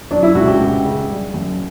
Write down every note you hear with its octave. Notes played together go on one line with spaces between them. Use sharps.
F#3 D4
E4
C#2 F#4
G4
C#2
C#3
G3
F#2